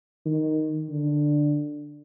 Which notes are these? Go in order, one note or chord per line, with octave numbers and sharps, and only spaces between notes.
D#3
D3